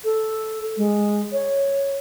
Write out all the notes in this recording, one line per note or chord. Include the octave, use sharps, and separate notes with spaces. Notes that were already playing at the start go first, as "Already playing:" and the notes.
A4
G#3
C#5